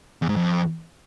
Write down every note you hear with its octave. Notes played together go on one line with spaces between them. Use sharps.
E2
G#2
F2